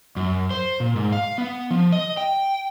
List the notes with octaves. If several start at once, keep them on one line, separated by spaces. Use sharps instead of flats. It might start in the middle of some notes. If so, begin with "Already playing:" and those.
F#2
C5
A#2
G#2
F5
B3
F3
D#5
G5